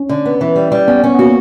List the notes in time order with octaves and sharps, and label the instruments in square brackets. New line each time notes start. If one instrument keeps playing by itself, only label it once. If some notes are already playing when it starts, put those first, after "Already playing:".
Already playing: [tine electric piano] C#4
[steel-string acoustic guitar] D3
B3
E3
G3
G3
[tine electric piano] B3 [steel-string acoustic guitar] C#4
[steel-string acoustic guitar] C#4
[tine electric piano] B3
[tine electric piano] A#3 [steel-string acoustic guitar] F#4